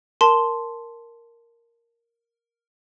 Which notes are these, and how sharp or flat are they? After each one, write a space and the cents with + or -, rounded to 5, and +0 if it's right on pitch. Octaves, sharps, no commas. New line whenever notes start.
A#4 +0 A5 +0 C6 -5